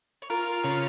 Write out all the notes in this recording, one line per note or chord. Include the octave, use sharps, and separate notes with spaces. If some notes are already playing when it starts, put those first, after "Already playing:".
C#5
F4 A#4
C#3 G#4